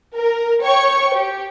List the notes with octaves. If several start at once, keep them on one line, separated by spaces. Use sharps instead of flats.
A#4
C#5 G5 C#6
G4